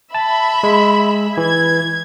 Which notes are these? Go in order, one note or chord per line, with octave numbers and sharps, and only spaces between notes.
E5 A5 B5
G#3
E3 G#6